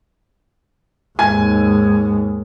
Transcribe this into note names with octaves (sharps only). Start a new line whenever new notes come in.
D#2 G#2 G#5